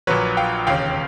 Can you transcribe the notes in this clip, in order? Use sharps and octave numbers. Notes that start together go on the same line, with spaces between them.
A#1 A#2 F#3 B4 C#5
F5 G5
E1 D#2 C#3 F5 G5